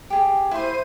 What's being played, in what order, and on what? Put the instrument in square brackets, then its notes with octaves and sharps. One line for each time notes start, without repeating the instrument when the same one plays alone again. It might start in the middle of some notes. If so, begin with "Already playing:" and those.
[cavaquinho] G4 G#4
[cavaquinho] E4 C6 [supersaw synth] C5 D#7